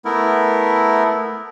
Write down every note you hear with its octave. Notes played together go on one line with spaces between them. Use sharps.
A3 B3 E4 A#4